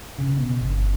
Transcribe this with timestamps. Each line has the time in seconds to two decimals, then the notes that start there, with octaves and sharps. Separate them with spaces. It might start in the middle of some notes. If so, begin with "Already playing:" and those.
0.18 C#3
0.37 B2
0.61 G1